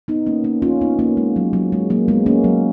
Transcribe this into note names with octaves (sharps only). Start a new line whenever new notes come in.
B3 D#4
A#3 C#4
A#3 C#4
C#4 F4
B3 D#4
A#3 C#4
G#3
F#3
F#3
G#3
F#3 A#3
G#3 B3
A#3 C#4
F#3